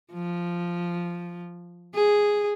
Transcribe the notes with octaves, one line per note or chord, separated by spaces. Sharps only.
F3
G#4